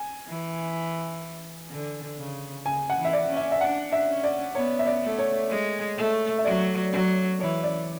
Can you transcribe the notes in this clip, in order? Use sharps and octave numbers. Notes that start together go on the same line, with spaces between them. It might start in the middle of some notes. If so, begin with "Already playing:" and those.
Already playing: G#5
E3
D3
C#3
C#3 G#5
F#5
E3
E5
D5
C#4
E5
E5
D4 F#5
E5
C#4
D5
B3 C#5
E5
D5
A3
C#5
G#3
A3
E5
F#3 D5
F#3
E3 C#5
D5